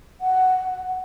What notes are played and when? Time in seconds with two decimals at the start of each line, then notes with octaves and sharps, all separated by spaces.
0.21 F#5